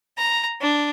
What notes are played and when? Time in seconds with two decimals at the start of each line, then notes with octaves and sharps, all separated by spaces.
0.17 A#5
0.61 D4